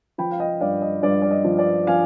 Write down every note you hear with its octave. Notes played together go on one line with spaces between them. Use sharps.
F3 G5 B5
F5
D#5 G5
G2 D5 F5
D#5
G2 D5
D5
D#5
F3
D5
F3 F5 G#5